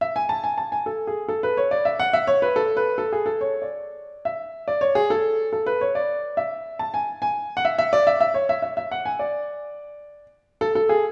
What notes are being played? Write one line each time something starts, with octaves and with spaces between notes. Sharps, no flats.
E5
G#5
A5
G#5
A5
G#5
A4
G#4
A4
B4
C#5
D5
E5
F#5
E5
C#5
B4
A4
B4
A4
G#4
A4
C#5
D5
E5
D5
C#5
G#4
A4
A4
B4
C#5
D5
E5
A5
G#5
G#5
F#5
E5
E5
D5
E5
E5
C#5
E5
E5
E5
F#5
G#5
D5
A4
A4
G#4